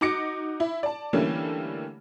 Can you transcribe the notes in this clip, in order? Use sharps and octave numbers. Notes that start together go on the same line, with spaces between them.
D#4 F#4 D6 A#6 C#7
E4
D5 A5
D3 E3 G3 A3 A#3 C#4